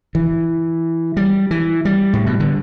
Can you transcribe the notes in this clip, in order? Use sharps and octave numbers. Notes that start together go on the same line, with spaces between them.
E3
G3
E3
G3
A2
B2
D3